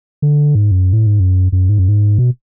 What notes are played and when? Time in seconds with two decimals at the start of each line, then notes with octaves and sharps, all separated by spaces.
0.22 D3
0.55 G#2
0.71 F#2
0.93 A2
1.07 G#2
1.20 F#2
1.52 F#2
1.69 G#2
1.78 F#2
1.88 G#2
2.18 B2